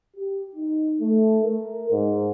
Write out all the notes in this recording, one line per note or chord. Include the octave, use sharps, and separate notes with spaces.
G4
D#4
A3
A#4
G#2